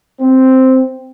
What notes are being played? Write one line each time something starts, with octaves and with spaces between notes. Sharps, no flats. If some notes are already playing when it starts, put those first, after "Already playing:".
C4